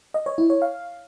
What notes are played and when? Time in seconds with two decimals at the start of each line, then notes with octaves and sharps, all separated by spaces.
0.14 D#5
0.26 C#5
0.38 E4
0.50 C#5
0.62 F5